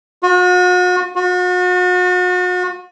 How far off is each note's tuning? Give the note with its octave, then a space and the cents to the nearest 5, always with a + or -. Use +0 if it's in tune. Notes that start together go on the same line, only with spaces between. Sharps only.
F#4 -40
F#4 -40